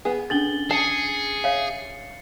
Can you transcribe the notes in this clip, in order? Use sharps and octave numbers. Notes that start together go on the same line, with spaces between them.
B3 G#4
C#4 D4 A4 A6 F#7 G7
G#4 A5 C7 C#7
C#5 E5 F5 G#5